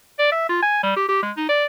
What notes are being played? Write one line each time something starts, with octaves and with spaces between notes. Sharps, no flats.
D5
E5
F4
G#5
G3
G4
G4
G#3
D#4
D5